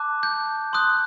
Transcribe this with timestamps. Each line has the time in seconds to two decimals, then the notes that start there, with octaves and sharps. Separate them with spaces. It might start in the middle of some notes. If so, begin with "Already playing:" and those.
Already playing: A5 D6 F#6
0.23 G6
0.73 C6 D#6 F#6